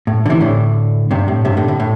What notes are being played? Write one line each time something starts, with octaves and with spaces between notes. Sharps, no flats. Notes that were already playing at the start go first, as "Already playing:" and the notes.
A2
D3
C3 E3
A2 D3
G2 C3
A2
G2 C3
A2 D3
A2
A2